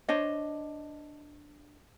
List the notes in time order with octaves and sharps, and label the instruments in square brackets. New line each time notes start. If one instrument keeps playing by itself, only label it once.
[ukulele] D4 C5 C#5 D#5